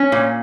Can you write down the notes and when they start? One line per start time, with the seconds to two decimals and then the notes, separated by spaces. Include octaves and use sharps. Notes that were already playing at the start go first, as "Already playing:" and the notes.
Already playing: C#4
0.12 A#2